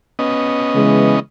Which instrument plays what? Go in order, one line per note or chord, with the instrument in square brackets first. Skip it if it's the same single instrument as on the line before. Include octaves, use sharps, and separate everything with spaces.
[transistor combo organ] B3 C#4 D#5
[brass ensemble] C#3 E3 G#3